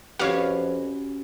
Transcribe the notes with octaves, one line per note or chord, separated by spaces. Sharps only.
F2 C#4 F#4 G4 B4 C#5 F5